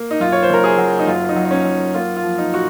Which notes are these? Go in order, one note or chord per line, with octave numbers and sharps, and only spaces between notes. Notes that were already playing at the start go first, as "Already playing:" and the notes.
Already playing: A#3
D#4
F#2 F4
C#5
C5
F#1 A#4
G#4
F#3
D#4
F#2 F4
D#4
F#3
D#4
C#4
F#3
A#3 F4
F4
F3
D#4
A#2 F#4